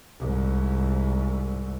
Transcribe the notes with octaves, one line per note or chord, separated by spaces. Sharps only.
C2 G#2